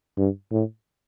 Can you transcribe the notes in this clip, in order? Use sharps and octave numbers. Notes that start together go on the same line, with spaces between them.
G2
A2